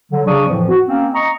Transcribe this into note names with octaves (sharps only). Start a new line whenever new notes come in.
D3 F#3
C#3 F#3 D4 D5 C#6 D#6
F2 A2 E3 F3
F#4
A#3 C4 C#4
D#5 A#5 C#6